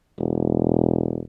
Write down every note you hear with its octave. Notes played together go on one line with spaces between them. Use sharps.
E1